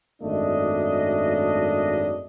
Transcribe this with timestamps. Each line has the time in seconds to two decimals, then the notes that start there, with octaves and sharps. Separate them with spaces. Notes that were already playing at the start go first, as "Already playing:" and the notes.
0.22 G#1 F#2 A3 D4 D#5